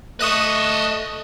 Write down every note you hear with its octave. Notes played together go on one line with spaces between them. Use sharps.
A3 D#5 E5 C#6 D#6 F#6